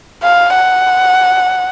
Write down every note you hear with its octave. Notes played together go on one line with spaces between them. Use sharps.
F5
F#5